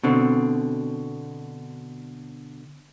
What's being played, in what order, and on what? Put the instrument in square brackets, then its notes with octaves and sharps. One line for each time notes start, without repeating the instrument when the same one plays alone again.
[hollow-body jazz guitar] B2 D3 C4